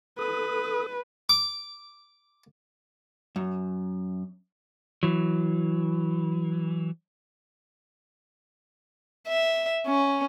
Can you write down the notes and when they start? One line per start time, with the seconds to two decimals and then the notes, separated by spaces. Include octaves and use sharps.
0.19 A4 B4 D#6
1.29 D6
3.36 F#2
5.03 E3 F#3
9.28 E5
9.86 C#4